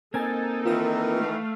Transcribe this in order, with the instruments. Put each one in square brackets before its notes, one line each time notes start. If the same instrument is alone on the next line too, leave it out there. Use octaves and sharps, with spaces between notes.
[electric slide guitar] A#3 C4 G#5 [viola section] D#4 A4 [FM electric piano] G#6 A6
[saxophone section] D#3 E3 [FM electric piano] F4 B4 E6
[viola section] A3 F5